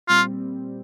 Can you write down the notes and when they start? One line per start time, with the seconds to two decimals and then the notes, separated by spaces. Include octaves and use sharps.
0.08 A#2 G3 C4 F4